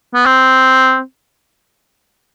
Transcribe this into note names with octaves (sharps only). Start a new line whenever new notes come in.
B3
C4